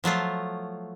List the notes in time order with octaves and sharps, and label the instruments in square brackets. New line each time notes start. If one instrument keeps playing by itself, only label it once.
[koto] F3 F#3 A3 F4